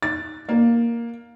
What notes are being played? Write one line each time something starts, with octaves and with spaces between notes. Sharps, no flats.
A6
A#3